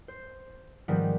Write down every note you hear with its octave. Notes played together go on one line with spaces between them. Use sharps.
C5
G#2 D#3 F3 G3 B3